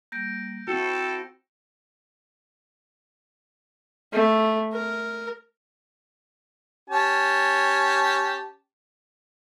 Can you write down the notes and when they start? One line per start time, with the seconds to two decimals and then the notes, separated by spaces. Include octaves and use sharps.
0.12 G3 A#3 G6 A#6 D7
0.68 C4 E4 F#4 A4 G5
4.12 A3
4.73 A#4
6.90 C#4 G4 A5